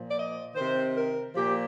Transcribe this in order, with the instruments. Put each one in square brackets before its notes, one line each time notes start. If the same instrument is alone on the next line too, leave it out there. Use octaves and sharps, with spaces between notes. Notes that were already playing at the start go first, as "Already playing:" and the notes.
Already playing: [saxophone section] A#2 F3
D5
D#5
C3 D#3 C5
A#4
A#2 F3 G4